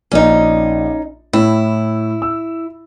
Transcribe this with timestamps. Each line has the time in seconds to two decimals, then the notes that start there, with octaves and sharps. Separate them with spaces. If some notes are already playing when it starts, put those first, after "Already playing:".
0.12 A#1 C#4 D#4 D5
1.33 A2 E4
2.22 E6